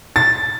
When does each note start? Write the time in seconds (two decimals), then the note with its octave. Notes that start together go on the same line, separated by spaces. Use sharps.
0.16 A6